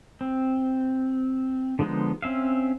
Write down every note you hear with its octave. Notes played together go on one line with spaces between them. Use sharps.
C4
D3 F3 G#3 B3 D#4
C4 C#4 E5 F5